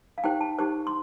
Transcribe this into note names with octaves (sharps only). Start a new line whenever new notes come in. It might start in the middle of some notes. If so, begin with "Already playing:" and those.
F5
D#4 G4 C5 G5
A5
D#4 G4 C5
C6